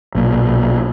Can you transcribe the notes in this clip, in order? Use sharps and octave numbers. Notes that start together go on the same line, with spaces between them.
B1 A#2